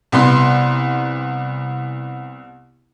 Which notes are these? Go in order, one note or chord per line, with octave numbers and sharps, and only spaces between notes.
C2 B3 C6